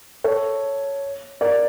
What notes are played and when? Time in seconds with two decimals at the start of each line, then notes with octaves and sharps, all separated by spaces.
0.24 A4 C#5
1.41 A#4 D5